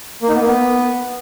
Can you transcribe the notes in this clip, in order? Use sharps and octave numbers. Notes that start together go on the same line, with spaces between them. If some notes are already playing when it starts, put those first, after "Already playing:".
A#3
D#4
B3
A#3
B3